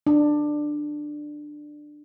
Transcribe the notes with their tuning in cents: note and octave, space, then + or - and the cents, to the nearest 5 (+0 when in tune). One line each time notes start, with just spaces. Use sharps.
D4 +15